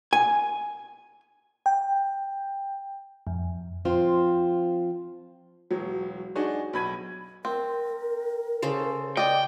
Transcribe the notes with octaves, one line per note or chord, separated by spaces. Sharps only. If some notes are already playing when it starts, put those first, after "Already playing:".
G#5
G5
F2
F3 C4 F4
E1 F#3
D4 D#4 F#4 G#4 C#5
B1 B5 G#6 D#7
C4 A#4
C#3 A4 C5
D5 D#5 G5